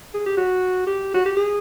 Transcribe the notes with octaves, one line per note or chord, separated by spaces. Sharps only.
G#4
G4
F#4
G4
F#4
G4
G#4